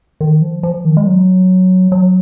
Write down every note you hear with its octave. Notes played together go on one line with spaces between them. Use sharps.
D#3
F3
F3
D#3
G#3
F#3
F#3